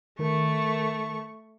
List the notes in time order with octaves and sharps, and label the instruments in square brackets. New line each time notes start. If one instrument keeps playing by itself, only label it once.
[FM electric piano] D#3 A#4 [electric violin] A3 C#6